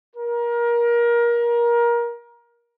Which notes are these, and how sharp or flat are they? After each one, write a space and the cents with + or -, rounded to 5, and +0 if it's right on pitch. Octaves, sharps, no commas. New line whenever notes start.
A#4 +25